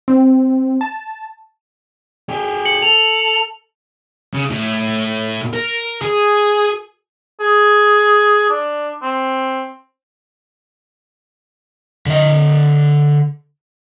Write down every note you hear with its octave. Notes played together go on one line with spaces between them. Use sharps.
C4
A5
G4 G#4
C#7 F#7
A4 F7
C#3
A2
A#4
G#4
G#4
D4
C4
D3 D#5